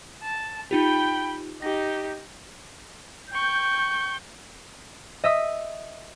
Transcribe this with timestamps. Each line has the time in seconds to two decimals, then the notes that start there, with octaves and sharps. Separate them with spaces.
0.23 A5
0.71 D#4 F4 G4 G5 B5
1.62 D#4 G4 A#6
3.31 G5 C#6 G6
5.24 D#5 E5 D#6